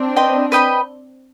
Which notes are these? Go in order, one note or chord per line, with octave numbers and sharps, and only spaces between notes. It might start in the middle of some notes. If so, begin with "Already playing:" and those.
Already playing: C4 D4
B4 D#5 G5 C6
B4 D#5 G5 B5